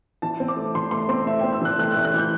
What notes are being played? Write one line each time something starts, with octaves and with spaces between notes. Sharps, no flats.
E3 A5
C4
D6
A3
E3 C6
A3 C6
C4 C6
A3 E5
C4 G5
E6
E3 F#6
A3 F#6
A3 F#6
F#6
E3 G6